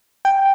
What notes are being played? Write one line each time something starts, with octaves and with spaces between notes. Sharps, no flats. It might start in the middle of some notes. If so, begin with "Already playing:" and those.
G5